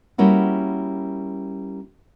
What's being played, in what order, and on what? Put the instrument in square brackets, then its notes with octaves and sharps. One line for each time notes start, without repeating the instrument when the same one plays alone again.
[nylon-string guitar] G3 A#3 C#4 E4 F#4